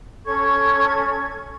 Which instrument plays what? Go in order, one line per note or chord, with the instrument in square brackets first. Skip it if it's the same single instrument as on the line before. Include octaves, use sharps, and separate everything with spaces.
[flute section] C#4 A4 C#6 G#6